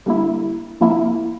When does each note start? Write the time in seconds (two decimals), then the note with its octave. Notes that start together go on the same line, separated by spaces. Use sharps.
0.06 D3 G3 A#3 E4
0.81 C3 F3 A#3 E4